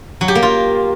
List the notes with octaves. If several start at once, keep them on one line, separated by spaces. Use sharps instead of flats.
F#3
G4
A#3
F4